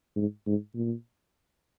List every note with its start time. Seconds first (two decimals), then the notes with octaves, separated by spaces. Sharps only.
0.16 G#2
0.47 G#2
0.75 A#2